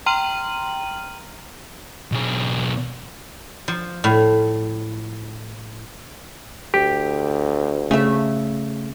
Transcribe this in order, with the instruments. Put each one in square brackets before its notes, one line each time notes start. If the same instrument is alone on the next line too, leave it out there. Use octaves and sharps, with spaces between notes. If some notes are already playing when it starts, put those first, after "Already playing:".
[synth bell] G5 A#5 C6 F6 D#7 F#7
[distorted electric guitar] B1 G#4
[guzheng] F3
A2
[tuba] D2 [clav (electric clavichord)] G4
[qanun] C#3 E5 [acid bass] A3